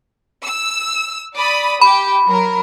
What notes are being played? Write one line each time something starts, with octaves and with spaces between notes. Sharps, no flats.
E6
D5 B5 D#6
G4 B5
F#3 A#4